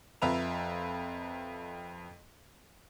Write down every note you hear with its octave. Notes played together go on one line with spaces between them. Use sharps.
F2 F4 B4 E5 A#5 F7